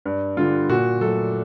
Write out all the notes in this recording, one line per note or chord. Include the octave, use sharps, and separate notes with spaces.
G2
D3 G3 F4
A#2 F#4
F#3 A3 A4